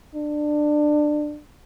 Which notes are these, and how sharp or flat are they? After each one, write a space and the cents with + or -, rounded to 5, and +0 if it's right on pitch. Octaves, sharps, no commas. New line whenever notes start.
D4 +20